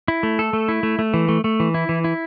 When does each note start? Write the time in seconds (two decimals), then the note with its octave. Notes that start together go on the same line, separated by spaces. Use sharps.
0.08 E4
0.23 A3
0.39 A4
0.53 A3
0.69 E4
0.83 A3
0.99 A3
1.14 E3
1.29 A3
1.44 A3
1.60 E3
1.74 E4
1.89 E3
2.04 E4